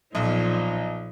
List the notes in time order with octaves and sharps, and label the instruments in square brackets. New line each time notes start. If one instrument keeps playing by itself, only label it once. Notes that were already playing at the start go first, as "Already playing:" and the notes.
[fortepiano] B1 [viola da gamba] A#2 F3 D#4